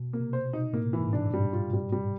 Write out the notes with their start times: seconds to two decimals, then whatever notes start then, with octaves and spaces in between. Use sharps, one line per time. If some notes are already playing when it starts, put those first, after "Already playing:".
Already playing: B2
0.13 A#3
0.20 C3
0.33 C5
0.46 B2
0.53 D#4
0.73 A2 A#3
0.93 E3
1.00 G#2
1.13 D4
1.26 G2
1.33 G3
1.53 F4
1.73 G3
1.92 G3